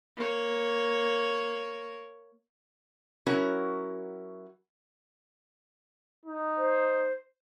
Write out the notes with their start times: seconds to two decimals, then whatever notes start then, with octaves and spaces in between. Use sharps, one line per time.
0.17 A#3 C#5
3.26 F#3 C#4 E4 F#4 A#4
6.25 D#4
6.57 C5